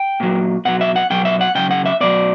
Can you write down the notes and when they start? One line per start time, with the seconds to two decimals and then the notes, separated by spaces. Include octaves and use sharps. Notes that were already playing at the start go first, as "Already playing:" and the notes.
Already playing: G5
0.20 A#2 F#3
0.65 B2 F#3 F#5
0.81 E5
0.96 F#5
1.10 B2 F#3 G5
1.25 E5
1.41 F#5
1.55 C#3 F#3 G5
1.71 F#5
1.86 E5
2.01 B2 F#3 D5